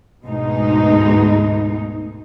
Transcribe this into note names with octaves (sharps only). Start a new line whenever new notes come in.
D2 G#2 B2 G#3 A3 D#4